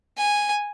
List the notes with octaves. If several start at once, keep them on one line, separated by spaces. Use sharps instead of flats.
G#5